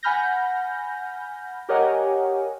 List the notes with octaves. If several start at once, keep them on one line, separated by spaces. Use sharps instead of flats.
F#5 G#5 B5 F6 G6 A#6
G4 A#4 C#5 D#5 F#5 G#5